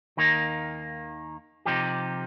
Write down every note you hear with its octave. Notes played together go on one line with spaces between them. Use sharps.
D#2 D#3 A#3 D#4 A#4
C3 F3 D#4 G4